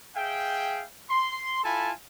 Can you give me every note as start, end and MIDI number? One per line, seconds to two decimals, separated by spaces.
0.15 0.85 68
0.15 0.85 76
0.15 0.85 77
0.15 0.85 79
1.10 1.62 84
1.64 1.91 64
1.64 1.91 65
1.64 1.91 69
1.64 1.91 80
1.64 1.91 81
1.64 1.91 83